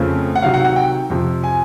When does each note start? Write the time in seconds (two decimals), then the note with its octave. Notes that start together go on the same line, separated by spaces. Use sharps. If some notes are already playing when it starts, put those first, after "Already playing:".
Already playing: F2 C#3 F3 A3 C4
0.35 F#5
0.42 C3 D#3 F#3 F5
0.54 F#5
0.65 F#5
0.76 G5
1.10 F2 C3 F3
1.44 G#5